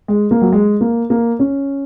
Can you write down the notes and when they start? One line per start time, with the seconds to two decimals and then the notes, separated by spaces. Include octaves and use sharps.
0.08 G#3
0.31 A#3
0.42 F#3
0.52 G#3
0.81 A#3
1.10 A#3
1.39 C#4